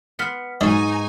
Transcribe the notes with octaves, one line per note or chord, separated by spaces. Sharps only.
B3 C6 F6 B6 C#7
G#2 F#3 G#3 D#4 G#5 C#6 D#6